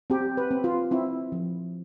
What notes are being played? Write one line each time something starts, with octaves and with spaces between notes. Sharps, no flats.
C4 G4
B4
C4
F4
C4 E4
F3